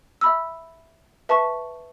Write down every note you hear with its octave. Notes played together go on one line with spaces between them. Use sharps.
E5 B5 E6
B4 E5 A5 C#6